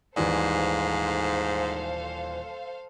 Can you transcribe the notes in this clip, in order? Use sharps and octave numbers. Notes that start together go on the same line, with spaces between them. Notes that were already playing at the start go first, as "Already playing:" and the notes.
D#1 G#2 E3 A4 C5 D5 F5